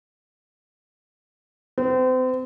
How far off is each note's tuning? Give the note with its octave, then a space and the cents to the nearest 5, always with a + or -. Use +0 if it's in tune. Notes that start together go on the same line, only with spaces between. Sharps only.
C4 -35